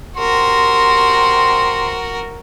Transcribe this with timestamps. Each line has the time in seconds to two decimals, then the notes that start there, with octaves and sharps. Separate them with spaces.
0.17 C3 F#4 A#4 C6